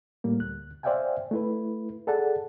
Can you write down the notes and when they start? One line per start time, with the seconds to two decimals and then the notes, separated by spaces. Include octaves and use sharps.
0.24 A2 G3 A#3
0.39 D2 F#6
0.83 C5 D5 E5 F5 G5 G#5
1.31 A3 E4 B4
2.07 G#4 A4 D5 F#5 A5